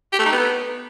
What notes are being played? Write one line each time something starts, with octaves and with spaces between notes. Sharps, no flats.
G4
A3
D#4
B3